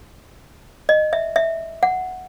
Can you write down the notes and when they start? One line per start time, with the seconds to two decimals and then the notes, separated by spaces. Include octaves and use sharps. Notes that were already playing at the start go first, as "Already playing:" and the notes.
0.89 D#5
1.13 E5
1.36 E5
1.83 F#5